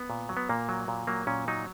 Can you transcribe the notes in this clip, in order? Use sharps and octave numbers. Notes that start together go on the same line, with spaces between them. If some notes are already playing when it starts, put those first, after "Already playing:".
Already playing: B3
A#2
F#3
B3
A#2 A#3
F#3
A#2
F#3 A#3
A#2 C#4
F#3 D#4